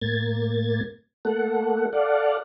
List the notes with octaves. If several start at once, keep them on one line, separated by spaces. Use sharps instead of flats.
A2 A#3 G#6 A6
A3 A#3 A4 F#5
A4 D5 F5 F#5